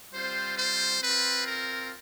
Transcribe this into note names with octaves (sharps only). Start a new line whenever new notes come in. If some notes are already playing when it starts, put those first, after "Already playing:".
G3 C4 F4 C5
C5
C4 F4 B4
A#4